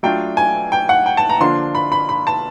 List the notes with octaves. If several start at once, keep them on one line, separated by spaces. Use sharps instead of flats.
F#3 A3 D4 F4 G5
G#5
G5
F#5
G5
A5
A#5
D3 F3 A#3 D4 F4 C6
B5
B5
B5
A5